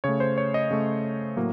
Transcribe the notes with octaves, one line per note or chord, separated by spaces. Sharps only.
C#3 A3 C#5
C5
C#5
D#5
C#3 A3
A2 F#3 A#3